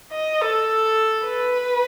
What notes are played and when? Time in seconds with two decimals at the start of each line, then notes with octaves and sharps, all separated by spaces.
0.13 D#5
0.42 A4
1.25 B4